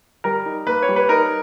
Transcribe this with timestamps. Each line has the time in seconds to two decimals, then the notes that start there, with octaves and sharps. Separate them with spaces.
0.24 G3 A#4
0.46 D#4
0.67 A#3 B4
0.82 C#5
0.88 G3
0.96 B4
1.09 D#4 A#4